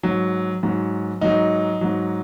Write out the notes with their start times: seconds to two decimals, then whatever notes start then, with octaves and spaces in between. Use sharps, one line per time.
0.03 G#2 F#3
0.63 G#2 F#3
1.21 G#2 F#3 D#4
1.81 G#2 F#3